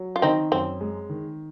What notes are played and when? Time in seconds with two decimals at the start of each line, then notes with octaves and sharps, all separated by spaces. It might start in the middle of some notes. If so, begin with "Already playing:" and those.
Already playing: F#3
0.16 F4
0.22 D#3 C4 D#4
0.52 F#2 C4
0.80 G#3
1.09 D#3